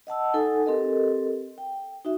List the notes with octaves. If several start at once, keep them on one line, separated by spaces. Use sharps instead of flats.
D#5 F#5 A5 E6
D#4 A4 F#5 G#5
C4 G4 A4 A#4 D#5
G5
D#4 F#4 E5